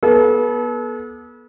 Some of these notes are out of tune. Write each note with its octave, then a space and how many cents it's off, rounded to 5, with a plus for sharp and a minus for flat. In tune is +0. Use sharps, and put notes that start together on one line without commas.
B3 -30 A4 -35